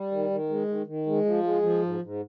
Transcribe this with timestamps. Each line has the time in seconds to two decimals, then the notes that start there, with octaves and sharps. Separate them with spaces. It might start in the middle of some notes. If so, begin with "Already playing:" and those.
Already playing: G3
0.11 D#3
0.30 D#3
0.49 G#3
0.68 D#3
0.86 D#3
1.06 G#3
1.25 F3
1.43 G#3
1.62 F3
1.82 G#2
2.01 G#2